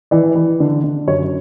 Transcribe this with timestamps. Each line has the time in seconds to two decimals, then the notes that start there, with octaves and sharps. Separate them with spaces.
0.11 E3 D5
0.35 E3
0.60 D3
0.84 D3
1.08 F#2 C#5